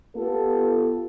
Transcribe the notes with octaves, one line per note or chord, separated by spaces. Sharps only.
B3 F4 G4 A4